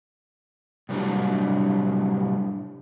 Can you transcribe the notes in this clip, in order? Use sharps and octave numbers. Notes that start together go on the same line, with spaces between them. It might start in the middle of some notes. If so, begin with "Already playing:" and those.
A2 C3 F#3 G3 D4 G4